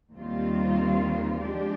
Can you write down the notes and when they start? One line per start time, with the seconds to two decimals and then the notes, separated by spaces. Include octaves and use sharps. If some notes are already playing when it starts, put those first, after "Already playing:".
0.12 D#2 D#3 G3 C4 F4
1.39 F3 G#3 D4 G4 D5